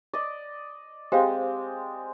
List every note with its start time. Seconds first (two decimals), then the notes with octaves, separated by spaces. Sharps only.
0.13 D5 D#5
1.12 G#3 C4 G4 C5 F5